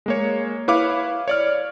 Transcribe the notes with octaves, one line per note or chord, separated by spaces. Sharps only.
G#3 A#3 C#5
E4 B4 C#5 F5 D6
C#5 D5 F6